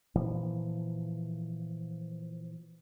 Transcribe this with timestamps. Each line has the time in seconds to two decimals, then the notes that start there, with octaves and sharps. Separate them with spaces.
0.15 A#2 E3 F3